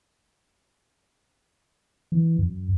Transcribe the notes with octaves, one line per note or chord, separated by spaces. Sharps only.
E3
F#2